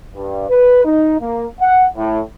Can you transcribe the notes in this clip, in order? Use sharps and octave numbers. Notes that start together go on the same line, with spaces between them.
G2
B4
D#4
A#3
F#5
A2